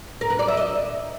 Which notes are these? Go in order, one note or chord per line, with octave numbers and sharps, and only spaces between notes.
A#4
B4
D5
E5
D#5